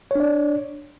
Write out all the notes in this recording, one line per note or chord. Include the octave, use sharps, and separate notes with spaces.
D4 C#5 D5